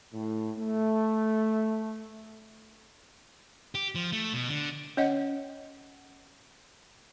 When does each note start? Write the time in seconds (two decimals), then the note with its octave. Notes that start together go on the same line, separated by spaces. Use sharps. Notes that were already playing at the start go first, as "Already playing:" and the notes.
0.12 A2
0.58 A3
3.75 G4
3.95 F3
4.13 A3
4.33 B2
4.48 D3
4.97 C#4 C#5 D#5 F#5